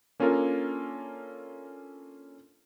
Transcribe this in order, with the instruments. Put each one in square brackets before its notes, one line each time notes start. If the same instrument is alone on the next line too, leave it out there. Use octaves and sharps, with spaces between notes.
[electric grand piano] A#3 C#4 D4 F4 A4 A#4